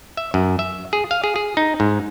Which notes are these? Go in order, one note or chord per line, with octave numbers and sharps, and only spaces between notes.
E5
F#2
E5
G#4
F5
G#4
G#4
D#4
G#2